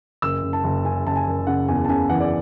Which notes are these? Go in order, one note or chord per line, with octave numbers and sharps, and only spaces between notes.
F#1 E6
F#1
A5
F#1
C#3 G#5
F#1 A5
G#5
F#1
C#3 F#5
E2 G#5
A5
C#3 G#5
E3 F#5
D5